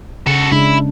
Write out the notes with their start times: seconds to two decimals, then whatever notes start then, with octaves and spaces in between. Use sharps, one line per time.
0.27 C#3 F#4 A4
0.52 C#3 G#3 D4 E4